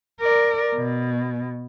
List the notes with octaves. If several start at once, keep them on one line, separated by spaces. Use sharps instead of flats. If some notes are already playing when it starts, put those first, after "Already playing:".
A#4 D5
B2